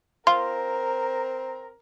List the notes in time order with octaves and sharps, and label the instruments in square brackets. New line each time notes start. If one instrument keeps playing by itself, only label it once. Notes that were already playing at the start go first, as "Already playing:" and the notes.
[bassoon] C4 [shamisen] F4 [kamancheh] A#4 A#5 [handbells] C6